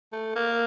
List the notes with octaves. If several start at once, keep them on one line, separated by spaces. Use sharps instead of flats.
A3
A#3